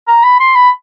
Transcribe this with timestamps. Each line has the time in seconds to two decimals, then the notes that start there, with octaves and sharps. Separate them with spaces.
0.08 A#5
0.24 B5
0.40 C6
0.56 B5